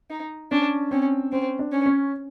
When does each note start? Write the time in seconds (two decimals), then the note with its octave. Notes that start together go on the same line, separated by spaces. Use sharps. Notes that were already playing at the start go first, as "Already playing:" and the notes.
0.10 D#4
0.51 C#4 D4
0.91 C4 C#4
1.32 C4 C#4
1.59 D4
1.72 C#4
1.86 C#4